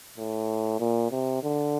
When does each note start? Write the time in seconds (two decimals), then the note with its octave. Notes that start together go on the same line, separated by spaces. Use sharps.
0.17 A2
0.80 A#2
1.11 C3
1.43 D3